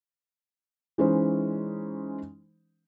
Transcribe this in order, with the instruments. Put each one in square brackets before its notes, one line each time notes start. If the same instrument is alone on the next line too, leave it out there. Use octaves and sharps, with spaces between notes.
[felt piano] E3 G#3 C#4 D#4 C5